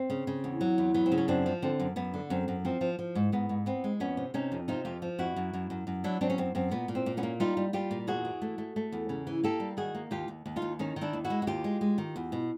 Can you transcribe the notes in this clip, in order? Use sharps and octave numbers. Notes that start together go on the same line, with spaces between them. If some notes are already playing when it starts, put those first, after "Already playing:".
Already playing: C4
C#3
C#3
E2
F#3
E2
F#3 B3
C4
C#3
C#4
F#2 C4 D4
F3
D3 C4
F#2
F#2 B3
D3
F#2 C4
F#2
F3 C4
F3
F3
G#2
G#2 B3
G#2
B3 C4
G#3
F2 B3 C#4
C3
C3 C#4 D#4
F2
C3 D#4 F4
F2 F4 G4
F3
F2 E4 F#4
F#2
F#2
F#2
F#2
F#3 D4 E4
F#3 C4 D4
C#4
F#2 C4
F#2 C4
A#2 B3
A#2
C4
A#2
B3 C#4
A#3
G3 D#4 F4
G3
G3 F4 G4
A#2
E2 F#4 G#4
E3
A3
A3
A3
E2
C#3
E3
A#3 G4 A4
G3
D#3 F#4 G#4
A#3
D#2 F4 G4
D#2
D#2
D#4 F4
D#2
D#3 C#4 D#4
D#3
D4 E4
D#2
E4 F#4
G#3
F#4
D#2 F4 G4
G#3
G#3
D#3
E2
B2